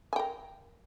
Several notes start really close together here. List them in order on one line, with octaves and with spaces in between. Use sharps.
G#5 G5 A#4